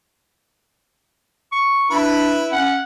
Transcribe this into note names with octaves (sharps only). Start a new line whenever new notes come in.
C#6
D4 E4 B4 B5
C#4 F#5